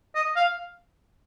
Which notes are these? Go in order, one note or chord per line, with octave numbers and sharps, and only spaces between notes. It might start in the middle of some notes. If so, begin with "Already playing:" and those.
D#5
F5